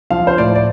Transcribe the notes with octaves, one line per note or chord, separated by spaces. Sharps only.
F3 F5
C5
A2 D5
D5